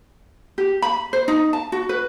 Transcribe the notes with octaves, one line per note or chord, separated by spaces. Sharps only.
G4
B5
C5
D#4
A5
F#4
B4